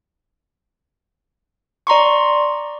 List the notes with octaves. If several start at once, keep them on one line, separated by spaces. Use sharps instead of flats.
D5 A#5 C6 C#6